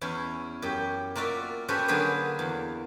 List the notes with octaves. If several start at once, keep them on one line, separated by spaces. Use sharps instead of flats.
E2 C#4 E4
F#2 G4
A#3 F4 F#4 D5 E5
C#4 F#4 G4 A4 B4 C5
D3 F#3 A#3 G#4 B4 C5
E2